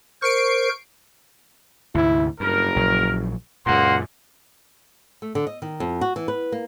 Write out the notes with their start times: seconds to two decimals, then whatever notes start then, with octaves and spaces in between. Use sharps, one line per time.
0.22 A#4 C5 C#6 C7 D7
1.95 D2 G#2 C3 E4
2.40 F#1 G2 A#4
2.76 A#1 F#3
3.66 C#2 F#2 A#2 A#3 F#5 C6
5.22 A3
5.35 D3
5.47 D#5
5.62 D#3
5.80 F2
6.01 F#4
6.16 E3
6.28 B4
6.52 A#3